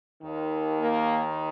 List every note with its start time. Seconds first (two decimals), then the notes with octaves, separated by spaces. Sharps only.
0.22 D#2 D#3
0.79 A#3